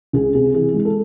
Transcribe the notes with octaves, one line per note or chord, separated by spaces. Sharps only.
C#2 G#4
C3 G#4
E3 G#4
G#3
A4